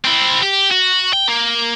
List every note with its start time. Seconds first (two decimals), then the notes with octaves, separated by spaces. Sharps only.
0.05 C4 E4
0.43 G4
0.71 F#4
1.13 G5
1.28 A#3